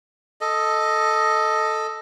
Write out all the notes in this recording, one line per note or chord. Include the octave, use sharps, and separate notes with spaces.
A4 D#5